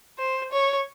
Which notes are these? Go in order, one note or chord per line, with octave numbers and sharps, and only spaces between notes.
C5
C#5